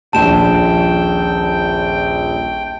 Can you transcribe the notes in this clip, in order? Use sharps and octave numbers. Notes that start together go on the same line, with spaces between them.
D#1 A#1 G5 A5 E7